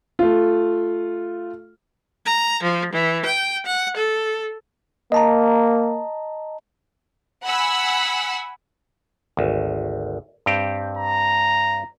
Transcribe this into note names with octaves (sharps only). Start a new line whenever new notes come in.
A3 F4
A#5
F3
E3
G5
F#5
A4
A#3 D#5 A5 A#5
F#5 G#5 B5 E6
G#1 D2
G2 C4 G4
A#5